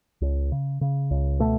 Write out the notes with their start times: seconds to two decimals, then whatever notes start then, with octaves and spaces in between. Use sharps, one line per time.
0.21 C#2
0.52 C#3
0.81 C#3
1.11 C#2
1.39 B2 A3